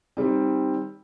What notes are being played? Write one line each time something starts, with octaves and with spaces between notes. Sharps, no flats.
D#3 G3 C4